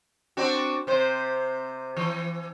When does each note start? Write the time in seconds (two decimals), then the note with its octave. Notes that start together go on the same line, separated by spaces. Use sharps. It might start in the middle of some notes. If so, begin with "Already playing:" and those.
0.37 C4 D4 F#4
0.87 C3 C5
1.97 E3